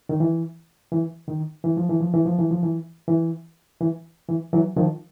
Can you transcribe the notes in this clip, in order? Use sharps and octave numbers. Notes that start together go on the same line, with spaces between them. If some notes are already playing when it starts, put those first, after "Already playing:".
D#3
E3
E3
D#3
E3
F3
E3
F3
E3
F3
E3
F3
E3
E3
E3
E3
E3 F#3
D#3 F3